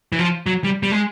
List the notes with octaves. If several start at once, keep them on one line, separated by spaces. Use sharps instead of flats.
E3
F3
F#3
G3
G3
G#3